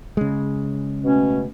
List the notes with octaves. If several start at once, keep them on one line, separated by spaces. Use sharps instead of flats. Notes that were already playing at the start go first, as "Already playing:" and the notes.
C#3 G#3
B2 A3 C#4